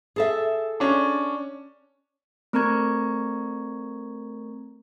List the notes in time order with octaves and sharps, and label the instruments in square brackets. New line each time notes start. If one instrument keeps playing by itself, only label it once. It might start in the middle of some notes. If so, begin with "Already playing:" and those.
[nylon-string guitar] G#4 A4 E5
[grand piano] C#4 D4
[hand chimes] A3 C4 A#4 A#5 C#6 G#6